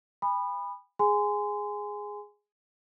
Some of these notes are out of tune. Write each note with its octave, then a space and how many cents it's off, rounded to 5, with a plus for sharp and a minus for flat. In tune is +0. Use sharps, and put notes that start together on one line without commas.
G#5 -45 B5 +0 D#6 -35
G#4 +0 G#5 -5 C6 -25